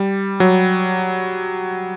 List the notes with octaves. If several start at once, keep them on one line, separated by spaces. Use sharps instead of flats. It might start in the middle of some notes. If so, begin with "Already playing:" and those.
Already playing: G3
F#3